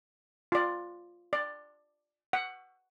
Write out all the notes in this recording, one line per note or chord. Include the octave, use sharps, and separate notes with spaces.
F4 D5
D5
F#5